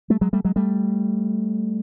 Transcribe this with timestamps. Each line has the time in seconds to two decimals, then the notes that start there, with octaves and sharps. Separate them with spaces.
0.10 G3 A3
0.21 F#3 G#3
0.33 G3 A3
0.45 F#3 G#3
0.56 G3 A3